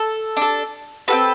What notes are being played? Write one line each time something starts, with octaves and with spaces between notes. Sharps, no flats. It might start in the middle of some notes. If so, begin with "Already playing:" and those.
Already playing: A4
D4
A4
C4 F#4 A4 B4